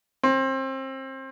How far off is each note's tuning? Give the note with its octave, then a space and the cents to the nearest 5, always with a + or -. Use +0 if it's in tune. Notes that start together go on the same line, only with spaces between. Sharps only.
C4 +30